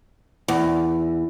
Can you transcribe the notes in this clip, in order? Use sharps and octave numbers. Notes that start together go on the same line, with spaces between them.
E2